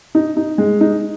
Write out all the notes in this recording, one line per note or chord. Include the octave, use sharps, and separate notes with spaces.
D#4
D#4
G#3
D#4